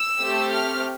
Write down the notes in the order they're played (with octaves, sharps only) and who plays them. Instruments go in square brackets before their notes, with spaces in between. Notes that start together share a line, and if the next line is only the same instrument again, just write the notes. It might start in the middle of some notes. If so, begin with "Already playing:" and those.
Already playing: [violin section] E6
A3 C4 G4
F6